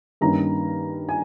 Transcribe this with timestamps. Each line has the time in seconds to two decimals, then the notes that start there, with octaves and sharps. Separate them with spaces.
0.21 G2 D#3 A#3 C#4 A#5
1.09 G#5